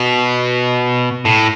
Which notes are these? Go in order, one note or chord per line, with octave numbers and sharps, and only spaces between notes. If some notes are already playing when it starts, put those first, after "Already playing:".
Already playing: B2
A2